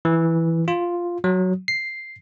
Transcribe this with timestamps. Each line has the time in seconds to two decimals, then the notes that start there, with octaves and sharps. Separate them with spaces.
0.05 E3
0.68 F4
1.24 F#3
1.68 C7